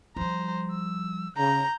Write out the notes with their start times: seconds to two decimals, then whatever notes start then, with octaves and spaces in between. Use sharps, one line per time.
0.16 F3 G3 C5 A#5
0.71 E6
1.37 C#3 A#5 G6